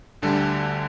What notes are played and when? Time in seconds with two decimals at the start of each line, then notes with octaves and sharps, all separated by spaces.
0.22 D2 D3 G3 A4